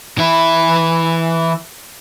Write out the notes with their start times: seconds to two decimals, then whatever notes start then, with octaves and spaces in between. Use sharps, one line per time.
0.18 E3 E4